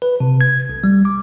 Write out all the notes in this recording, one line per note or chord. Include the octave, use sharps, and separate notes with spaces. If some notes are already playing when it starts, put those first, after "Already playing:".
B4
C3
G#6
B1
G3
D6